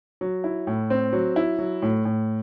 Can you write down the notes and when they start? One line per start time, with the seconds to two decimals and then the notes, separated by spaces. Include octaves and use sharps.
0.21 F#3
0.44 E4
0.67 A2
0.90 C4
1.13 F#3
1.36 E4
1.59 F#3
1.82 A2
2.05 A2